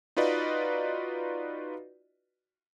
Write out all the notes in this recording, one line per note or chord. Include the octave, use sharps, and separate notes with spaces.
D#4 F4 F#4 B4 D5 D#5